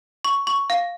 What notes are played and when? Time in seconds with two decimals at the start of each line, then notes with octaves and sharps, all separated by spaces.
0.25 C#6
0.47 C#6
0.70 F5